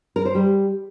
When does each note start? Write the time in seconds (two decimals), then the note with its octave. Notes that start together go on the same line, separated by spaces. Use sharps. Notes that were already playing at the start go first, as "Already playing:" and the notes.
0.16 A#4
0.25 C5
0.35 G3